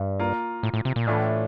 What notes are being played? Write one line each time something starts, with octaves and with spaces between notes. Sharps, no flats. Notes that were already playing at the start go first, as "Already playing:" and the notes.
Already playing: G2
A#3 F4 A#4
A2
A2
C3
A#2
A2 E3 A3 D4 F4